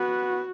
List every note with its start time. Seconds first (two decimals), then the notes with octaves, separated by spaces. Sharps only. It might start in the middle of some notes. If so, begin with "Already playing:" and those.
Already playing: B3 F#4